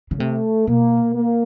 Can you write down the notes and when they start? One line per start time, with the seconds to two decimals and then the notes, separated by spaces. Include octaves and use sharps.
0.11 C#3
0.19 C3 A3
0.67 B2 A#3
1.15 A#3